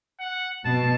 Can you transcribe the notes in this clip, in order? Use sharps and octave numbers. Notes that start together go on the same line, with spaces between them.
F#5
B2 A5